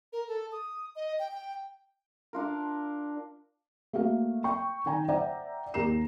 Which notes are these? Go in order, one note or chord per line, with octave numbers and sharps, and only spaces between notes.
A#4
A4
D#6
D#5
G5
G5
D4 F4 A#4
A3 A#3 F#4 F5
G5 C#6
D#3 G5 G#5 A#5
C5 D5 E5 F#5 G5 A#5
D#2 G4 A#4 A#5 C7 E7